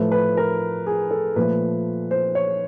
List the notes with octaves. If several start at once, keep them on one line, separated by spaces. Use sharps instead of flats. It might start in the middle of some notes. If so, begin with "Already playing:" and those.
Already playing: A2 F3 A3 B4
B4
A#4
G#4
A4
A#2 F3 A3 B4
C5
C#5